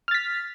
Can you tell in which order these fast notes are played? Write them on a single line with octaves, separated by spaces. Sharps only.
F6 A6 B6